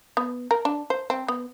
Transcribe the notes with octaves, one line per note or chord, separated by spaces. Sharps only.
B3
A#4
D4
C5
C4
B3